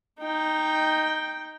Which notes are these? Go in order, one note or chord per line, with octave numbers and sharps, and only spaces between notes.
D#4 G5